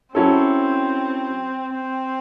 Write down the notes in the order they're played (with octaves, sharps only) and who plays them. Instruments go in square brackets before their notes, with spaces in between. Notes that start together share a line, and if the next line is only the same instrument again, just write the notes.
[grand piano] F#3 C#4 E4 A4 [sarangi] C4
[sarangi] C4